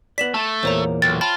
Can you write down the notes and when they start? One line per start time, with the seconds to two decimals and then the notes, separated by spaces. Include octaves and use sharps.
0.18 B3 D5 B6 E7 F#7
0.34 A3 A5
0.63 E2 A#2 A#3 C5 C#5 A#5
1.02 B1 G5 A6
1.21 F4 G5 A5 B5